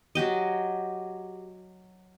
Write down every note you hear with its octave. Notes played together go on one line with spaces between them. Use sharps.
F#3 F#4 G4 D#5